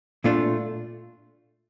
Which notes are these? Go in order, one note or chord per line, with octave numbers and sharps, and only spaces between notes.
A#2 A3 D4 F4